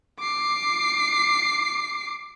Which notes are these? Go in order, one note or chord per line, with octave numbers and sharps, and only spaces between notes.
D6 C7